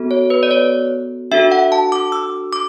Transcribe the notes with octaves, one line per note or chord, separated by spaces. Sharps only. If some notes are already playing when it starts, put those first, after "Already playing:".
Already playing: B3 F#4 A4
C#5
B4
D5
C#5
D4 F#4 A4 E5
F#5
A5
D6
E6
D6